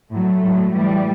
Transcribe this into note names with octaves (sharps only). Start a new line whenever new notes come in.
A2 F#3 A3
A2 F#3
A2 E3 G3